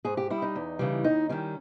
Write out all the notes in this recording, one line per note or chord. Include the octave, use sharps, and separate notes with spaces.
G#2 G#4
G4
G3 E4
D#4
E2
C#3 E3 G3
D#2 D#4
D#3 G3 C#4